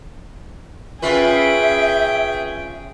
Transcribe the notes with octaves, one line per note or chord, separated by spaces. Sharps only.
C#4 F4 G#4 B4 E5 G5